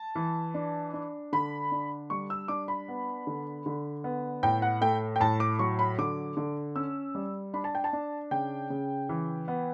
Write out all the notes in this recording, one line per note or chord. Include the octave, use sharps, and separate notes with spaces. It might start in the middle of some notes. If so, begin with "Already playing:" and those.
Already playing: A5
E3
D4
D4
D3 B5
D4
G3 C#6
E6
D4 D6
B5
B3
D3
D3
B3
A2 G5
F#5
A3 G5
G5
A2 A5
D6
F#3 C#6
B5
D3 D6
D3
C#4 E6
G3
D4 B5
A5
G5
A5
D4
C#3 G5
C#3
E3
B3